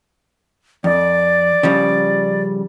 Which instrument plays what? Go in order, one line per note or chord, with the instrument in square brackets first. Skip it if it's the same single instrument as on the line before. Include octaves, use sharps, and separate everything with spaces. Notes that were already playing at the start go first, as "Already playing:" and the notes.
[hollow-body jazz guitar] F2 [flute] D5
[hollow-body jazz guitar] C#3 F3 G3